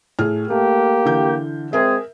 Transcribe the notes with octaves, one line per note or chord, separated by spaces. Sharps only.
A2 G#4 F6
A3 A#3 G4
D3 E3 G6
G#3 C4 G#4 A#4 E5